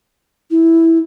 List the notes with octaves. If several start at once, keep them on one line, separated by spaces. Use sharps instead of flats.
E4